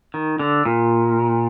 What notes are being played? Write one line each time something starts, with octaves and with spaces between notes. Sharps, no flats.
D#3
D3
A#2